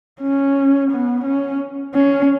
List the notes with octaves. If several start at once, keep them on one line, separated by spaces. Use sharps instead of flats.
C#4
B3
C#4
C#4